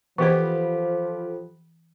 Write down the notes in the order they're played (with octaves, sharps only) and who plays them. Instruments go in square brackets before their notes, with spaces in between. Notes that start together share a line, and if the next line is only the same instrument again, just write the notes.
[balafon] E3 C5 [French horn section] F3 [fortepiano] B3 G4 [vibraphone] A4 B5